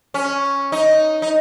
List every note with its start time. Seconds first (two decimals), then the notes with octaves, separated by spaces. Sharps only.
0.14 C#4
0.72 D#4
1.22 D#4